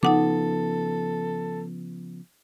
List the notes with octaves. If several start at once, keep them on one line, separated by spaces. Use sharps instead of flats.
C#3 F3 B3 D#4 A4 F#5 D6